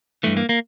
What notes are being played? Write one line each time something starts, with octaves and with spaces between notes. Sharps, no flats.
G2 E3 A3
A#3
A#3